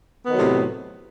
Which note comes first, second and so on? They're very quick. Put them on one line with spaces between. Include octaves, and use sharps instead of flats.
B3 D#3 F#3 A2 C3